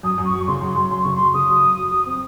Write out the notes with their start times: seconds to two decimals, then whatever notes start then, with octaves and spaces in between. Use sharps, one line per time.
0.03 F#2 D#6
0.18 F#2
0.25 C#6
0.33 F#3
0.47 C#3 C6
0.61 F#2
0.76 F#2
0.90 F#2 C6
1.03 C#3 C#6
1.15 F#3 C6
1.34 C#3 D#6
1.49 F#3
1.63 F#2
1.77 F#3
1.92 F#3
2.06 C4